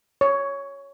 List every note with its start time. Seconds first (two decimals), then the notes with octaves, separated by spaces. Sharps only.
0.21 C#5